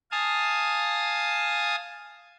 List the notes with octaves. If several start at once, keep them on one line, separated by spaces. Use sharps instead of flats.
F5 G#5 A5 D#6